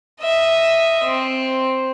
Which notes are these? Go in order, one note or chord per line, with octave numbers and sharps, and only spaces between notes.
D#5 E5
C4